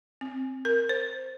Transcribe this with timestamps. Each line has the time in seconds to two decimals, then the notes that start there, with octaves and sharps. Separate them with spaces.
0.21 C4
0.65 A#4
0.89 C5